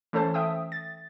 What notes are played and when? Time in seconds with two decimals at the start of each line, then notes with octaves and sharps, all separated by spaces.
0.13 E3 A3 C#4 A4 C5 A5
0.34 E5 G5 D#6
0.72 A6